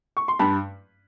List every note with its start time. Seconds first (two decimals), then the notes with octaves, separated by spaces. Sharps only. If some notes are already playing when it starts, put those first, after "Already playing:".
0.17 C#6
0.28 C6
0.39 G2 A5 B5